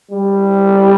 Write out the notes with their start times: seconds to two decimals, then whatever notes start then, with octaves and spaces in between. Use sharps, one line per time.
0.11 G3